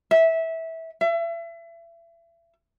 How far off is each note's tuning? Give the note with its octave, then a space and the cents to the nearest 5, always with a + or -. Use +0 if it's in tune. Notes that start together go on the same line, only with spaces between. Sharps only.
E5 -15
E5 +35